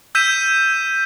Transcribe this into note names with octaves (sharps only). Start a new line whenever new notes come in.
E6 G6 B6 D#7 E7